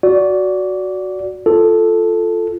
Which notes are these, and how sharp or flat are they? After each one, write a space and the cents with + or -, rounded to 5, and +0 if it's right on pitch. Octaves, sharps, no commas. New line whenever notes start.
F#4 +0 D5 -20
F4 +0 A4 +0